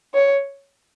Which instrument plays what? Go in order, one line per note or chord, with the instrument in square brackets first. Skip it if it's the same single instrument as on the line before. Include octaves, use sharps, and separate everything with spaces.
[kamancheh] C#5